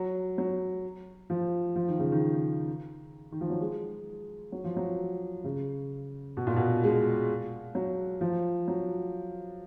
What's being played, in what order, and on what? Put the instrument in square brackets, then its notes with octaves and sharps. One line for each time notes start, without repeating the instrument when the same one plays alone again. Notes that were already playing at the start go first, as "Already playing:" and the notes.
Already playing: [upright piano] F#3
F#3
F3
F3
D#3
C#3
D#3
D#3
F3
F#3
G#3
F#3
F3
F#3
C#3
B2
A#2
B2
G#3
F#3
F3
F#3